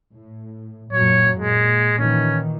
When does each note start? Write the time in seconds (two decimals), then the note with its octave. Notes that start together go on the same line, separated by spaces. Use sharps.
0.14 A2
0.93 F#2 A#2 F#3 C#5
1.39 A#2 G#3
1.99 A#2 D#3 E3 C#4